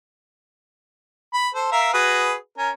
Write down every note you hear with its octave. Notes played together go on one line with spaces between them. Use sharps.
B5
A4 C5
A#4 E5 F5
F#4 G#4 B4
C#4 A#4